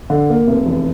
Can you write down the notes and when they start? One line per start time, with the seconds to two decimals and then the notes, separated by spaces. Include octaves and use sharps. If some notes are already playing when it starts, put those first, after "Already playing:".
0.10 D3
0.29 A#3
0.47 F1
0.66 E2